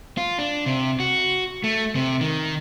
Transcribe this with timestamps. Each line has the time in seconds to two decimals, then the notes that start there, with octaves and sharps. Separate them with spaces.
0.17 F4
0.39 D4
0.66 C3
1.00 F#4
1.64 A3
1.95 C3
2.21 D#3